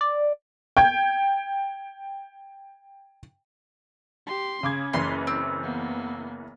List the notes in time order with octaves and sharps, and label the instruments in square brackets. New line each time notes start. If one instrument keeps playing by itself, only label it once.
[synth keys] D5
[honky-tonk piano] G5 G6 G#6
[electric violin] G4 C6
[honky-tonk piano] C#3 D6 G#6 [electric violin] C#4
[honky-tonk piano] F#1 E3 B6 [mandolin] C6
[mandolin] C4
[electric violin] A#3 B3